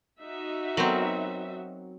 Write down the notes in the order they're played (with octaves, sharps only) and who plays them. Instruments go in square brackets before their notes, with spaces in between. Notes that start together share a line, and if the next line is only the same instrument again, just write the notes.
[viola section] D#4 F#4 E5
[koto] F#3 C4 [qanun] B3 A#4